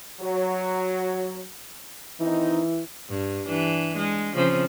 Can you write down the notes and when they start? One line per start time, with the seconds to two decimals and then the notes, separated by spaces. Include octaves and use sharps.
0.21 F#3
2.20 D#3 E3 C4 D#4
3.09 G2
3.45 E3 D4
3.97 G#3
4.35 C#3 F3 C4